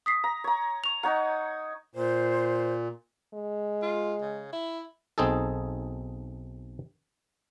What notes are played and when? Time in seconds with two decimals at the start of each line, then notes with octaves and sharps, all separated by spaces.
0.06 D#6 B6 C7
0.24 A#5
0.44 C#5 A#5
0.84 C#6 F7
1.03 D#4 C#5 D#5 F#5 A#5
1.95 A#2 C5
3.34 G#3
3.82 F4
4.22 C#3
4.52 E4
5.18 B1 C4 D#4 G#4 A4